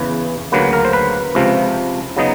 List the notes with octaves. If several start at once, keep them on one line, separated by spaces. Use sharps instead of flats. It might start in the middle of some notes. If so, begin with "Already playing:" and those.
Already playing: E2 C#3 E3 B4
D2 C#3 F#3 A#3 B4
A#4
C5
B4
C#2 C3 F3
C#3 F#3 B3 D#4